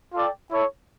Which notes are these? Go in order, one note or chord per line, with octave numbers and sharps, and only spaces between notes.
F4 A4 D5 G5
E4 A4 C#5